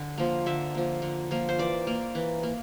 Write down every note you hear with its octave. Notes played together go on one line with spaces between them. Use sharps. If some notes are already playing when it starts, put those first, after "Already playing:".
Already playing: D3
F3 A#3
D3 E5
F3 A#3
D3
F3 A#3
C5
E3 D5
A#3
E3
A#3